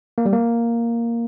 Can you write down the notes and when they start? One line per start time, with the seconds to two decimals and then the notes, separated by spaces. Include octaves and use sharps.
0.18 A#3
0.25 G3
0.33 A#3